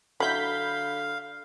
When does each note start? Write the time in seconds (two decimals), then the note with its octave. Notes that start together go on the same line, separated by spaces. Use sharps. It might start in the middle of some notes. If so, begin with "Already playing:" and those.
0.20 D3 F#3 E4 F5 B5 G6 B6